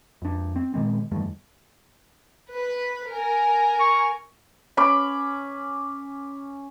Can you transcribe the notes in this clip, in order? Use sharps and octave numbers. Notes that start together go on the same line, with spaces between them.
F2 D4
C4
A#2 D#3 G#3 C4
E2 G2 D#3 A3
B4
A#4 G#5
C#6
C#4 B5 D6